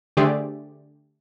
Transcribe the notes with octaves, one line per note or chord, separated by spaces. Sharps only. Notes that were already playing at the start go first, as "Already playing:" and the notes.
D3 A3 G4 G#4 C5 D5